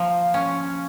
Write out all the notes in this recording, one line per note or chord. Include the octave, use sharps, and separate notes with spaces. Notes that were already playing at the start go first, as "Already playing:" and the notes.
Already playing: F3 A#3
C#4